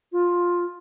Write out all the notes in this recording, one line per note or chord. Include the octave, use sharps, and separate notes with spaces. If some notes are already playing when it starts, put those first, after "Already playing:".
F4